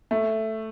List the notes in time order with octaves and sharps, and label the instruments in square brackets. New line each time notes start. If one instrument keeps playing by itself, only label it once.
[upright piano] A3